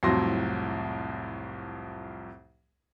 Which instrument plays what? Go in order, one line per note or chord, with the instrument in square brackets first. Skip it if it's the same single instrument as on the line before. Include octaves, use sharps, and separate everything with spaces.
[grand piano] C2 F2 A2 F#3 C6 A#6